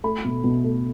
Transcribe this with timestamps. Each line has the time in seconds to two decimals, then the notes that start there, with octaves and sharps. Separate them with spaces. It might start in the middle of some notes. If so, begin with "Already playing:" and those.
0.04 A3 B5
0.24 B2
0.44 B2
0.64 A3